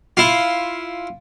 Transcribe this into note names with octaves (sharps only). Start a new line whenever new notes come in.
E4 F4